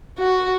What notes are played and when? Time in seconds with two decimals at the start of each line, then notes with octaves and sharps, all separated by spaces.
0.19 F#4